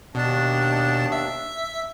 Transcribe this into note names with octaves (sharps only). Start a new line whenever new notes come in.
D#2 B2 D4 A5
E5